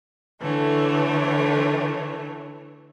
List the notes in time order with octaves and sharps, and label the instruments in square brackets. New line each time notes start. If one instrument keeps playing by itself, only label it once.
[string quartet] D3 E3 A3 C#5